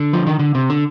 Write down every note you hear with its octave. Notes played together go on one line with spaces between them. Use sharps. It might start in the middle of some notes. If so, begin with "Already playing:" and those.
Already playing: D3
F3
D#3
D3
C3
D3